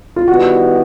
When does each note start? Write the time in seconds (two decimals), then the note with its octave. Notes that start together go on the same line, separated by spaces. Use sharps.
0.16 F4
0.28 D#3 G3 B3 E4 F#4